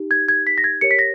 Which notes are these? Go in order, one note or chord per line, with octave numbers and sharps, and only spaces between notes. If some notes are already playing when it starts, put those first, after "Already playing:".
Already playing: D#4 G4
G#6
G#6
B6
A#6
G#6
G4 A#4 C#5 C#7
B6
A#6